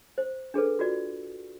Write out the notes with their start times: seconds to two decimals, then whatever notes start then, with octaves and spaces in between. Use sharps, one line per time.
0.18 C5
0.54 D4 G#4 A4 B4
0.79 F4 F#4 D5